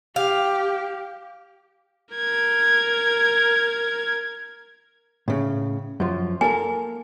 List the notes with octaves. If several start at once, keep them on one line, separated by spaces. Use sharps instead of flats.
G4 F5
A#4 G#6
A2 C#3
F#2 F3
A#3 A4 A#4 G#5